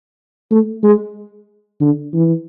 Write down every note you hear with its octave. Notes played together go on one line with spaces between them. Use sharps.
A3
G#3
D3
E3